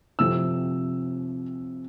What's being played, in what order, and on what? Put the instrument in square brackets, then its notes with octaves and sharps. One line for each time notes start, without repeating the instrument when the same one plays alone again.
[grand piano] C3 F3 A3 C4 E6